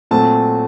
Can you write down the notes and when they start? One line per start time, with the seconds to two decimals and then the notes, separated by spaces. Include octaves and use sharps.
0.11 A#2 F#3 A3 C4 A5